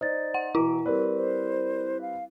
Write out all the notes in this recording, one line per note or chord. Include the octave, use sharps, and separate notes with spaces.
D#4 C5 D5 A6
F#5
B2 E3 E4 A#5 D6
G3 C4 A#4 B4 D5
C5
F5